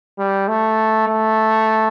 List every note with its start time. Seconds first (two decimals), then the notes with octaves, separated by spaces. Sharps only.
0.18 G3
0.48 A3
1.08 A3